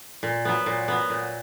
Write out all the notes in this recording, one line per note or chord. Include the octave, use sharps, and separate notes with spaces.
A#2
F#3 B3
A#2
F#3 B3
A#2